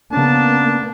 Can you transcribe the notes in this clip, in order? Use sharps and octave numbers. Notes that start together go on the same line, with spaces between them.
C#3 A#3 B3 C#4 D4 A5